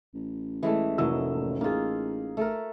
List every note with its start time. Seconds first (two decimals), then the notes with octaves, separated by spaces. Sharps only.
0.14 A1
0.63 E3 G#3 A3
0.98 F1 A2 F#3 A#3 D#5 E6
1.61 A#3 D#4 F4 G#4
2.37 A3 A4 A#4